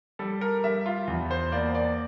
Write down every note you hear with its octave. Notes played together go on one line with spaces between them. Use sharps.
G3 A4
A#4
G3 E5
F4
E2
C5
A#3 D5
D5